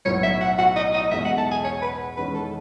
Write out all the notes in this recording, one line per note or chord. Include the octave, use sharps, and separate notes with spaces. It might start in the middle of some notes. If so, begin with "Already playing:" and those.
B1 A2 F#3 B3 C#5
E5
F#5
F#5
D#5
D#5
E2 B2 G#3 D#4 E5
F#5
A5
G#5
C#5
B4
E2 D#3 G#3 C#4 B4
A4